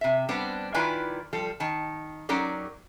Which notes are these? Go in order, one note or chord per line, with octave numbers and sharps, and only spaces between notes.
C3 E5
G3 B3 C4 D4
D#3 E4 F4 B4 D5 G#5
F3 G3 A4
D#3 A5
F#3 C#4 D#4 G4 A#4 D5